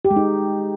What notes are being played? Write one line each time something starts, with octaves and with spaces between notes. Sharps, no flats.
G4
G#3
D#4